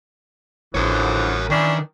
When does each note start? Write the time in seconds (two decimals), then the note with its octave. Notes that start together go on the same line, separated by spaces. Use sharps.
0.75 A1 D3 E3 F3 A#4 C#5
1.50 D#3 E3 C#4 D4